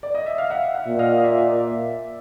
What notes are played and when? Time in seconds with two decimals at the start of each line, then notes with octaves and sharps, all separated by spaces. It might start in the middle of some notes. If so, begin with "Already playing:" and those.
0.03 D5
0.15 D#5
0.26 E5
0.38 F5
0.50 E5 F#5
0.75 E5 F#5
0.87 A#2
0.99 D#5 F5
1.18 D#5
1.24 D5 E5